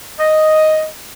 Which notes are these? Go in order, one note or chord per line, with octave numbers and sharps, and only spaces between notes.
D#5